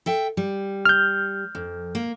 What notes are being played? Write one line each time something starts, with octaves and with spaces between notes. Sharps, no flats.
A4 E5 G5
G3
F6 G6
F2
A#3